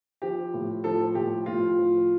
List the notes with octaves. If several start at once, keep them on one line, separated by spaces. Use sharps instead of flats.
F3 G4
A2
F3 A4
A2 G4
A2 F4
F3